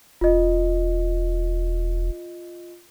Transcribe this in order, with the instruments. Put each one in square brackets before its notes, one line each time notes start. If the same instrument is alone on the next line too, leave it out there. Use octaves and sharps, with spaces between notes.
[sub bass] E1 [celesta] F4 D#5